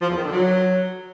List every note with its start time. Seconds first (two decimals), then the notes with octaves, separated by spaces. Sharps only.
0.02 F3
0.09 E2
0.17 D#3
0.24 D3
0.32 F#3